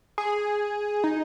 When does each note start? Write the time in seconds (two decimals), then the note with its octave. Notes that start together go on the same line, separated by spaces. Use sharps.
0.18 G#4
1.04 D#4